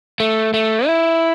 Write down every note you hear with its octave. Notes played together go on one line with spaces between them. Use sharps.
A3
A3
E4